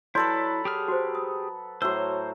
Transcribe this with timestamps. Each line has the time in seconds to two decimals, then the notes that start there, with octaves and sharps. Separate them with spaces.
0.15 F#3 E4 A4 B4 C#5 D5 C6
0.65 G4 G#4 F6
0.88 F#4 C5
1.15 D#6
1.82 A2 F#3 F#4 C5 E6